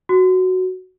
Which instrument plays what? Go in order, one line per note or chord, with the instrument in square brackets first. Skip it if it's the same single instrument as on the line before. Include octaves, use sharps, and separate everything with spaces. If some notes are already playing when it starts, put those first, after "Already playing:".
[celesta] F#4